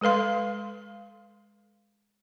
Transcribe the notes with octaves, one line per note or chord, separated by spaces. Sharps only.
G#3 A4 B4 F5 C6